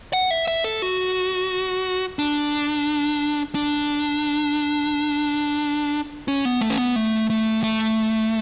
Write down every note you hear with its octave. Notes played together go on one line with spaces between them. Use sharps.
F#5
E5
E5
A4
F#4
D4
D4
C#4
B3
A3
C#4
B3
A3
A3
A3